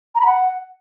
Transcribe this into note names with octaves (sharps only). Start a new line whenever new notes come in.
A#5
B5
F#5